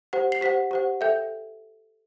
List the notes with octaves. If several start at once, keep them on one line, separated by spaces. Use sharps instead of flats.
G4 C5 F#5
C7
G4 C5 F#5 B6
G4 C5 F#5
A4 E5 G5 G6